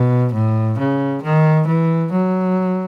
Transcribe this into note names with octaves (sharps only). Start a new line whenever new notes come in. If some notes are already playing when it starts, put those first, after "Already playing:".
Already playing: B2
A2
C#3
D#3
E3
F#3